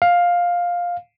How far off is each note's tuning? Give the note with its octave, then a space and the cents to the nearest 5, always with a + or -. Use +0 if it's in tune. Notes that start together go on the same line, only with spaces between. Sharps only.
F5 +10